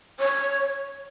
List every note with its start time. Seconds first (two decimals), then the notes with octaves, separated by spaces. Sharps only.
0.19 C#5